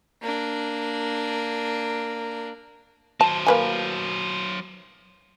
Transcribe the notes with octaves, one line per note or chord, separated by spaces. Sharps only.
A#3 D4
F#3 C5 A5
A#3 B4 G#5